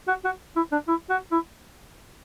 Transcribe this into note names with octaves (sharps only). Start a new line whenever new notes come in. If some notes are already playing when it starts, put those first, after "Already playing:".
F#4
F#4
E4
D4
E4
F#4
E4